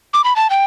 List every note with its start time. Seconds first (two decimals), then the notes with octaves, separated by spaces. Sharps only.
0.14 D6
0.24 B5
0.36 A5
0.50 G5